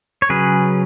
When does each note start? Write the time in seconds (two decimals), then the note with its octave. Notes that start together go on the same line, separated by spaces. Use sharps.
0.22 C#5
0.29 C#3 F#3 C#4 G#4 B4